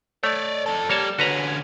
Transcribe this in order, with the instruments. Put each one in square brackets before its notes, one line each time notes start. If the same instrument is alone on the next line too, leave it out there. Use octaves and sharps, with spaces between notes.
[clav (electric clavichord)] A3 [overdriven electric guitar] C#5 D5
[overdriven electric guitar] F2 A4
[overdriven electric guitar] G3 [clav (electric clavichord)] A#3 C#5 A5
[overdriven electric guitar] D3 C#4 [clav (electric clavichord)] F#4 B4 A#5